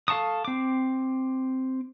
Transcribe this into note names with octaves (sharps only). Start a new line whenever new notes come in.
A4 F5 A5 C#6 D#6
C4 D6